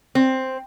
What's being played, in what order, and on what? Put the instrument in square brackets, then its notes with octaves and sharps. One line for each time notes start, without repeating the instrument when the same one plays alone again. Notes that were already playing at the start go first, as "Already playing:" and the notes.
[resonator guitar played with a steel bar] C4